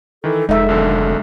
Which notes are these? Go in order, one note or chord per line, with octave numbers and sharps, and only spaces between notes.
D#3 E3 A4
F1 G#3 D#4 A4 E5
B1 D3 D#3